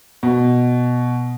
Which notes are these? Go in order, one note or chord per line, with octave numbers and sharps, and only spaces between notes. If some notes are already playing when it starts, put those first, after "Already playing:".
B2